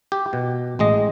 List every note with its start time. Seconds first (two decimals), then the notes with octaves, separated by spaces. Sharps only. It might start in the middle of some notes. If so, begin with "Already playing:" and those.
0.12 G4
0.33 B2
0.79 A1 G#3 D#5